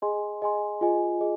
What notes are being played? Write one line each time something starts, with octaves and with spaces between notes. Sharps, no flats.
G#4 D#5 G#5 C6
G#4 D#5 G#5 C6
F4 G#4 D#5 G#5
G#4 D#5